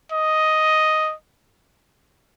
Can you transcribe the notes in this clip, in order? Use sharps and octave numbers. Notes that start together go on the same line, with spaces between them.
D#5